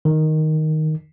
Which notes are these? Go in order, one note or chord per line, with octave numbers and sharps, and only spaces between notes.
D#3